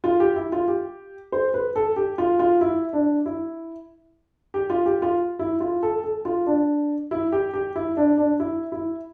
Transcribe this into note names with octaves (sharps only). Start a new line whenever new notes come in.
F4
G4
E4
F4
G4
C5
B4
A4
G4
F4
F4
E4
D4
E4
G4
F4
G4
F4
E4
F4
A4
A4
F4
D4
E4
G4
G4
E4
D4
D4
E4
E4